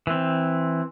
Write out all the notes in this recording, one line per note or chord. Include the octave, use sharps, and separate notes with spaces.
E3 C4